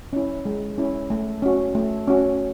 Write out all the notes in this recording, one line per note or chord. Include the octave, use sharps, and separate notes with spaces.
C#4 E4
G#3
C#4 E4
A3
C#4 F#4
A3
C#4 F#4